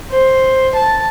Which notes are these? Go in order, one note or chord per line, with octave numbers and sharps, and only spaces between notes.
C5
A5